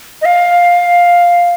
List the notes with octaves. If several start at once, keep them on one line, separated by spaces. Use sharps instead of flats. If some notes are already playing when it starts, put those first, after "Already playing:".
D#5
F5